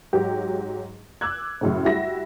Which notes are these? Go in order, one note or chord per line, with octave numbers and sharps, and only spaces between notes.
G#2 F#3 G4
D6 E6 F#6 G#6
F#2 A2 C#3
G3 E4 F#4 E5 A#6